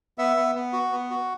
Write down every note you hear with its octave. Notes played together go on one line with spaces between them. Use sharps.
B3 E5
B3
B3
F#4
B3
F#4